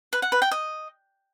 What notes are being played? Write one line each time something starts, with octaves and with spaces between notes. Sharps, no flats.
B4
F#5
B4
G5
D#5